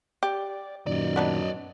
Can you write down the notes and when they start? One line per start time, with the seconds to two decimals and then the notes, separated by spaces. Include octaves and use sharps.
0.23 G4 D5
0.87 F#2 A#2 D#3 D5 D#5
1.16 B3 D4 D#4